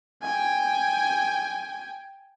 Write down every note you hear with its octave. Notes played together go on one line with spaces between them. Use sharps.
G5 G#5